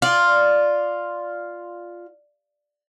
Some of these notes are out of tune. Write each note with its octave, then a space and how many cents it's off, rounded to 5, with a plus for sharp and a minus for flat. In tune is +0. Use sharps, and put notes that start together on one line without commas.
F4 +0 D5 +0